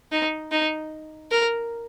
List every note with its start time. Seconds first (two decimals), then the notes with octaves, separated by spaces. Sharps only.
0.12 D#4
0.52 D#4
1.31 A#4